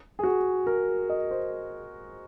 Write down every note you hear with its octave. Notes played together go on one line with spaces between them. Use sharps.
G#4
F#4
A#4
D#5
C5